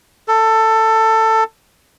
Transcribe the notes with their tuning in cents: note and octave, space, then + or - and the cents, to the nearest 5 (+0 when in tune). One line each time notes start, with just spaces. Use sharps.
A4 +15